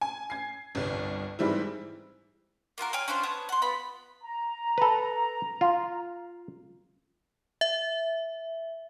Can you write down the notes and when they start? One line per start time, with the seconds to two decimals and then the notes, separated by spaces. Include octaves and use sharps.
0.01 G#5
0.30 G#6 C7
0.75 G1 C2
1.39 G#2 D#3 E3 G3 C4 E4
2.78 A#3 F4 F#4 A#4
2.93 C#5 G5 G#5 F6
3.08 C#4 D4 F4 C5
3.23 B3 C#5 A5 D#6
3.49 F#5 C6
3.62 B3 F4 B5
4.23 A#5
4.78 A4 B4
5.61 F4
7.61 E5